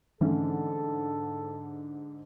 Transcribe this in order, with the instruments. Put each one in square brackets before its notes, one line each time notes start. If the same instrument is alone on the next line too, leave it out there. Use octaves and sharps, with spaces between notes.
[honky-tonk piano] G#2 D3 [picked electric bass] E3 A3 C#4 [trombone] A4